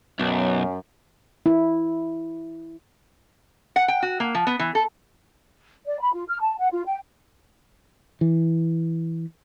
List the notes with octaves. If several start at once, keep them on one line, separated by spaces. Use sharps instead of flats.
B1 F#2
E4
F#5
G5
F#4
A#3
F3
B3
E3
A4
D5
B5
F4
F6
A5
F#5
F4
G5
E3